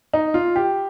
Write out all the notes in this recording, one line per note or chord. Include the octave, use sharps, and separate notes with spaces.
D#4
F4
G4